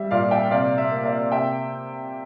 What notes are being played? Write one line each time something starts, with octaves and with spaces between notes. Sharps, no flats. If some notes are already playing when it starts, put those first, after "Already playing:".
Already playing: G3 E5
A#2 D5 F5
E5 G5
C3 D5 F5
E5
A#3
D5 F5
C3 E5 G5